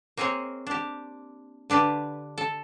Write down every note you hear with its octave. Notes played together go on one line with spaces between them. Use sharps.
A#3 C4 G#4 C#5 D#5
D4 G4
D3 D4 G4 B4
A4